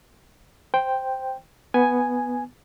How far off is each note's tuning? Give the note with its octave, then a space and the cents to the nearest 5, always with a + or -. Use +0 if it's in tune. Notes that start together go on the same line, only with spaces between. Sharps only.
C5 +0 G5 +0
B3 +0 G#5 +0